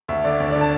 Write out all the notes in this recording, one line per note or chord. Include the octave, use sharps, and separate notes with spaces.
D2 E5
D3 D5
D2
D3 D5
A5